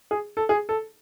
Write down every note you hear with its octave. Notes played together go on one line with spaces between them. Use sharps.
G#4
A4
G#4
A4